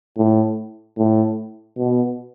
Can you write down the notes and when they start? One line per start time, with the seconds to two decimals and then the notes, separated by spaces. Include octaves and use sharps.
0.18 A2
0.98 A2
1.78 B2